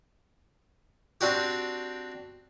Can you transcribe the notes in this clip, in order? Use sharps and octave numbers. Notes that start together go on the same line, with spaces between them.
C4 D4 F#4 G4